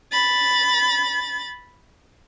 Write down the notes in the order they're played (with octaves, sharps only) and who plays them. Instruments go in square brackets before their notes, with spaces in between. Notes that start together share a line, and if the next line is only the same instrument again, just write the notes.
[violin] B5 A6